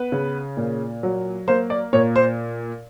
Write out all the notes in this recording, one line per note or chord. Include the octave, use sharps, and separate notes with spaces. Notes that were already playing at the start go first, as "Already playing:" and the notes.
Already playing: B3 B4
C#3
A#2
F#3
A#3 C5
D5
A#2 C#5
C5